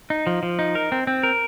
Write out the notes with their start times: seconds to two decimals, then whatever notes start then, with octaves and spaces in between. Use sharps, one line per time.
0.10 D#4
0.27 F3
0.43 F3
0.59 D#4
0.75 A#4
0.92 C4
1.07 C4
1.23 A#4